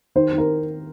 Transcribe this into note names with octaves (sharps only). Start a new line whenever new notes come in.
D#3 C5
D#3 A#4